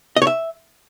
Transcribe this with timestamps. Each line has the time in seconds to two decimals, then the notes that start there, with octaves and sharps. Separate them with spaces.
0.16 D#5
0.22 C#5
0.27 E5